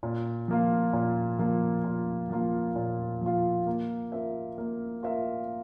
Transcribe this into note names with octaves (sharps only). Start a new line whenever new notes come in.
A#2
F3 A#3 F4
A#2
F3 A#3 F4
A#2
F3 A#3 F4
A#2
F3 A#3 F4
A#3
F4 A#4 E5
A#3
F4 A#4 E5